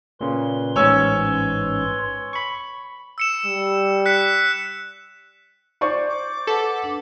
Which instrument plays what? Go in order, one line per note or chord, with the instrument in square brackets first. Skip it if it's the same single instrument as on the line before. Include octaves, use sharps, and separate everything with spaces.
[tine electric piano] A#2 C#3 [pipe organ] B4 C6
[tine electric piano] A1 G#2 C#4 [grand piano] C#5 G#5 E6
[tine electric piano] B5 C#6
[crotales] E6 C#7 E7
[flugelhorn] G3
[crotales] F#6 B6 C#7
[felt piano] C5 D5 C#6
[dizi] D6
[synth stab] A4 [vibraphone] B4 F#5
[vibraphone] D4